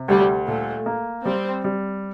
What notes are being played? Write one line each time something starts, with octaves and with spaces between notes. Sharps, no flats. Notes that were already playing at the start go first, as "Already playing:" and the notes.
Already playing: C3
D2 G3
A#2 A3
A#3
G3 C4
G3